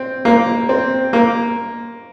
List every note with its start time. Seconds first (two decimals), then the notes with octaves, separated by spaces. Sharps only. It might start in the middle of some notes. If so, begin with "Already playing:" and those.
Already playing: C4
0.25 A#3
0.69 C4
1.13 A#3